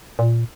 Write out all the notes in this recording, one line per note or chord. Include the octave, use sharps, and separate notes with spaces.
A#2